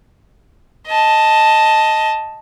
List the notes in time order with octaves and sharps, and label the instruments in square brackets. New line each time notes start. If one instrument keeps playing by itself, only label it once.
[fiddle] D#5 A5